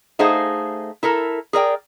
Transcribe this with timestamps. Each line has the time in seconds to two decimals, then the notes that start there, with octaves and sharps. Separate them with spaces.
0.19 A3 D#4 G#4 C5 F5 F#5
1.03 E4 A4 A#4
1.53 G#4 A#4 D5 G5